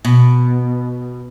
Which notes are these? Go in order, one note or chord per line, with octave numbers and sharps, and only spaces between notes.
B2